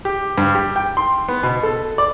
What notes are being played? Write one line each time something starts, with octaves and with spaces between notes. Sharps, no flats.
G4
G2
G4
G5
C6
B3
B2
A4
D5